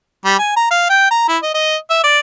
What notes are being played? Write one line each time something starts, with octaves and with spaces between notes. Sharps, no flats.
G3
G#5
A#5
F5
G5
A#5
E4
D#5
D#5
E5
D5